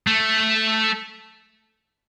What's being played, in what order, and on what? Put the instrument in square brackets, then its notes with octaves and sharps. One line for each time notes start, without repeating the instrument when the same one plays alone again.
[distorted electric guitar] A3